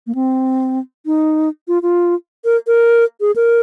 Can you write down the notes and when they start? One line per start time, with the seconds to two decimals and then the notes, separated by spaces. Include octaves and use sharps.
0.07 A#3
0.15 C4
1.06 D#4
1.68 F4
1.82 F4
2.45 A#4
2.67 A#4
3.21 G#4
3.36 A#4